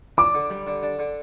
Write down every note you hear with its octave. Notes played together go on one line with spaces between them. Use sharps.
D4 D6
D3
G3
D3
D4
D3